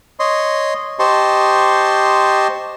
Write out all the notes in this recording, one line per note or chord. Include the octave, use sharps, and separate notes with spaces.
C#5 D#5 C6
G4 C5 D#5 A5 C6 C#6